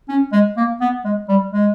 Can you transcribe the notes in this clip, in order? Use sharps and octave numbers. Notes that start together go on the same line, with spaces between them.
C#4
G#3
A#3
B3
G#3
G3
G#3